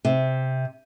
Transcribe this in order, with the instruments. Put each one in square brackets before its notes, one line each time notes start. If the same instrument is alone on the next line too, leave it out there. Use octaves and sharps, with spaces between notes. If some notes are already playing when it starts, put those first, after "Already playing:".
[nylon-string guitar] C3